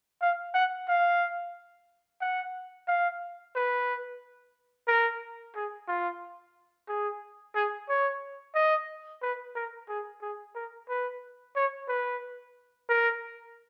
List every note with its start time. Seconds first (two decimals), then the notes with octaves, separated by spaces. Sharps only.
0.21 F5
0.54 F#5
0.88 F5
2.21 F#5
2.88 F5
3.55 B4
4.88 A#4
5.55 G#4
5.88 F4
6.88 G#4
7.55 G#4
7.89 C#5
8.55 D#5
9.22 B4
9.55 A#4
9.89 G#4
10.22 G#4
10.55 A#4
10.89 B4
11.55 C#5
11.88 B4
12.89 A#4